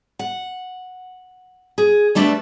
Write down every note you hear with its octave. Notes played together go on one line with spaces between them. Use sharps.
F#5
G#4
G3 A3 D4 B4 C#5 E5